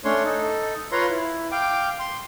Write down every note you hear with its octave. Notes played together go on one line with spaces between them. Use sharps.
A3 C#4 D4 C#5 C6
D#4 A4
F4 B4 C#5 F5 A#5 C6
E4
F5 G5 D6
C6